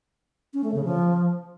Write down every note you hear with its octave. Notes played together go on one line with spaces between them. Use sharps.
C#4
A3
C#3
F3